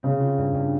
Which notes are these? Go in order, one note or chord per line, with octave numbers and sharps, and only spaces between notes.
C#3 C4
F4
G2
G2